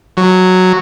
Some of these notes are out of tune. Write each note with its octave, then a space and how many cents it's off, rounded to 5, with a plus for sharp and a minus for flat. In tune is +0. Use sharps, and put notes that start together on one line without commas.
F#3 -5